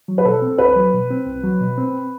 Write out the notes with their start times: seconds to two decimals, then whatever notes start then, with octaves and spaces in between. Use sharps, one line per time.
0.08 F#3
0.18 B4
0.25 B2 A4
0.42 C4
0.58 C2 B4
0.76 F#3
0.93 B2
1.10 C4
1.27 C2
1.44 F#3
1.61 B2
1.78 C4